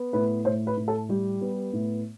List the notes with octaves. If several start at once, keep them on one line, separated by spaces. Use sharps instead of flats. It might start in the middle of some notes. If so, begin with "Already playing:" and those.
Already playing: B3
A2 B4
A2 C5
B4
A2
A4
G3 G4
B3
A2